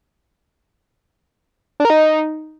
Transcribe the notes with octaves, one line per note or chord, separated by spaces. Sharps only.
D4
A#4
D#4